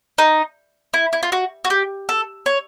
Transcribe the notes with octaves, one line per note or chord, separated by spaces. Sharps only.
D#4
E4
E4
F4
F#4
F#4
G4
A4
C#5